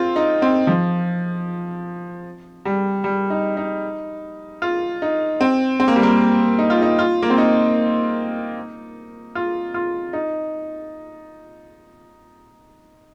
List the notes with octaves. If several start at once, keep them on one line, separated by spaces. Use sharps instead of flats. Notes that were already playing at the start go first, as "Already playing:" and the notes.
Already playing: C4 F4
D#4
C4
F3
G3
G3
D#4
D#4
F4
D#4
C4
C4
A#3
G3
A#3
D#4
F4
D#4
F4
A#3
C4
D#4
F4
F4
D#4